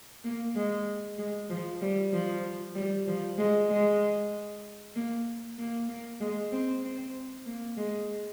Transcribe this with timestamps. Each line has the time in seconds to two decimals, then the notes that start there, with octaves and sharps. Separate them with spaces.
0.24 A#3
0.55 G#3
1.19 G#3
1.50 F3
1.82 G3
2.12 F3
2.75 G3
3.07 F3
3.38 G#3
3.70 G#3
4.96 A#3
5.58 A#3
5.89 A#3
6.21 G#3
6.52 C4
6.84 C4
7.46 A#3
7.77 G#3